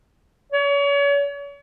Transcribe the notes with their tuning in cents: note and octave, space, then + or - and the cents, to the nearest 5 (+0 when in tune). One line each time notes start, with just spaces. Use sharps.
C#5 +35